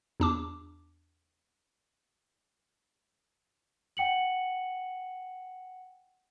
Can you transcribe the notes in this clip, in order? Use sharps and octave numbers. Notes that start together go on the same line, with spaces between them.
E2 D4 D6
F#5 G5 C#7 F#7